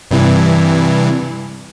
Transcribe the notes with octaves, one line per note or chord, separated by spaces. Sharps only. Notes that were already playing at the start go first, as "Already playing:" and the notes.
G2 C3 E3